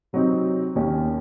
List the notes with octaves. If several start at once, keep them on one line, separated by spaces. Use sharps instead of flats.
C3 F#3 C4 D#4
D#2 D#3 A#3 C#4